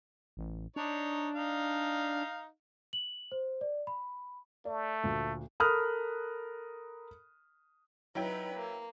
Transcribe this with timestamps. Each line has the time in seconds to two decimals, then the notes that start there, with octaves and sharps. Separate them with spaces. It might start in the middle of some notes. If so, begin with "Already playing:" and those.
0.37 A1
0.76 D4 D#4 C#5
1.35 D#4 F5
2.93 F#7
3.32 C5
3.61 D5
3.87 B5
4.65 A3 D5
5.04 D2 A#2
5.60 A4 A#4 B5 D#6 F6 F#6
8.15 F#3 D#4 E4 B4 G5
8.53 A#3